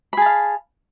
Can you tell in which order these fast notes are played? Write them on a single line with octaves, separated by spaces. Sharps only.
B5 G#4 A5 F5